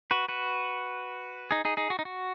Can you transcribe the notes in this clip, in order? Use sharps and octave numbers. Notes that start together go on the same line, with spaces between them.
F#4 B4
F#4 B4
D#4 G#4
D#4 G#4
D#4 G#4
F#4
D#4
F#4